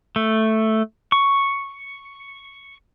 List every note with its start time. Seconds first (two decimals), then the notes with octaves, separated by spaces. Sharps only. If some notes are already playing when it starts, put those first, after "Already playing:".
0.16 A3
1.12 C#6